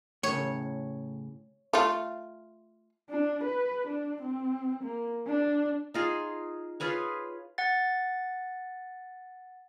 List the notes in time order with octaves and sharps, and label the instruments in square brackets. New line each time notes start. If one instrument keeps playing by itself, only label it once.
[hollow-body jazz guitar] A2 C#3 [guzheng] C#5
[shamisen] A3 F4
[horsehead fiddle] D4
B4
D4
C4
A#3
D4
[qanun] D#4 F4 G#4
F4 G#4 B4 C#5
[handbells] F#5 A6